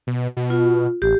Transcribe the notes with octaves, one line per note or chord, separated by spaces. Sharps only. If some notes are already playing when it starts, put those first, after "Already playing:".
B2
B2
F4
A1 G4